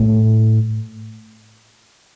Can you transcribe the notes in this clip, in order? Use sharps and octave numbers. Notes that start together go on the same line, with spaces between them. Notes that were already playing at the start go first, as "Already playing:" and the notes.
Already playing: A2